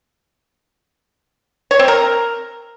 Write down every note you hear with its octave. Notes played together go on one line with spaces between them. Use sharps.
C#5
C4
A#4